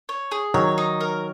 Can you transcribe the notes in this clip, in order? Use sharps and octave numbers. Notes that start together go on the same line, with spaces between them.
C#5
G#4
D#3 F#3 C#5
D#4
A#4